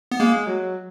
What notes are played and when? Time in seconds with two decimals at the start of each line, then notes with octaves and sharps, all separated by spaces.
0.12 B3
0.20 G#3 A#3
0.46 F#3